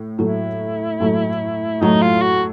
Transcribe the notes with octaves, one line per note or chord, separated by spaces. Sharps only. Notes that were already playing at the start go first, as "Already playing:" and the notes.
Already playing: A2
A2 F#3 A3 E4
A2 F#3 A3
A2 F#3 A3 D#4
F4
F#4